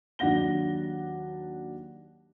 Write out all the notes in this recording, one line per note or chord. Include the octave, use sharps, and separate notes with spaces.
D#2 F#3 D4 F#5 A#6 G7